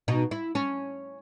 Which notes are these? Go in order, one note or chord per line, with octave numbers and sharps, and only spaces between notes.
B2 D#4
E4
C#4